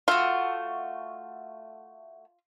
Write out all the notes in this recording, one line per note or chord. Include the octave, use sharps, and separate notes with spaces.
A3 F4 F#4